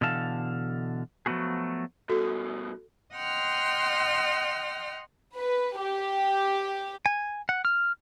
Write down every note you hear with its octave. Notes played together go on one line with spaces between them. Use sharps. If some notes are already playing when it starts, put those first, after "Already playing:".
B2 D3 E3 A4 F5 A5
F3 F#3 A3 B3 F#4 G#4
G2 B2 F#4 A4
D#5 F#5 G5 C6 F6
B4
G4
G#5
F#5
F6